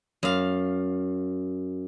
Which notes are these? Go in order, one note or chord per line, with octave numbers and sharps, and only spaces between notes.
F#2 F5